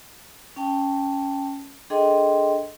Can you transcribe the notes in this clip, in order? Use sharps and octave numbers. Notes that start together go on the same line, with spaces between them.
C#4 G5 A5
D4 G#4 A4 D#5 G5 C6